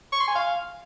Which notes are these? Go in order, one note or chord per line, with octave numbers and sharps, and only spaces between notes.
C#6
C6
G#5
F5